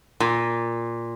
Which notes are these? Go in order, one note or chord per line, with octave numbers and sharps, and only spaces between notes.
A#2